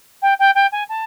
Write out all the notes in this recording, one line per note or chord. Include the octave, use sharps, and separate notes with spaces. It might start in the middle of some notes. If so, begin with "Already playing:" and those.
G5
G5
G5
G#5
A5